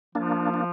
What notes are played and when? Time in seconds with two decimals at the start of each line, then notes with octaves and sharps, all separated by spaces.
0.15 F3 A#3 D4
0.54 D4